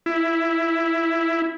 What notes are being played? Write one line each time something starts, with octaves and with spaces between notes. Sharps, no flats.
E4